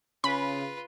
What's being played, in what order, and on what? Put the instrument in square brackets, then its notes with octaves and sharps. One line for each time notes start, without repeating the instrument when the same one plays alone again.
[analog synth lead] C#3 [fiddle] F4 B4 [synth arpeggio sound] B5